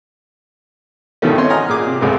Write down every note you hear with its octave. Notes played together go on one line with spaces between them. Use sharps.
G2 B2 D#3 E3 A3 C#4
C4 C#5 D#5 C6
D#5 G#5 A#5 D#6 F6
A#2 G#4 D6
C3
C#2 F#2 C#3 G#3 A3 C4